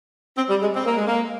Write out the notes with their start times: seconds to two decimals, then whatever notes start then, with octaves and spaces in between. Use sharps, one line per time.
0.37 C4
0.49 G3
0.62 G#3
0.75 C4
0.86 A#3
0.96 G#3
1.07 A#3